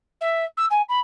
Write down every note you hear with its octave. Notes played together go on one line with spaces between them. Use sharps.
E5
E6
G#5
B5